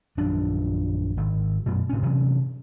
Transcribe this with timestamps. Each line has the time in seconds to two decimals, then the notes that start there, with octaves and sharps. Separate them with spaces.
0.17 A#1 F#2 D#3 D4
1.17 G#1
1.66 F#2 B2
1.89 A2 C#4
2.03 C3 E3 F#3 C#4